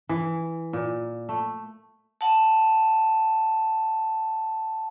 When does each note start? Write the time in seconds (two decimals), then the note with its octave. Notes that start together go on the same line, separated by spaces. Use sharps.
0.09 E3
0.73 A#2
1.29 A3
2.21 F#5 A5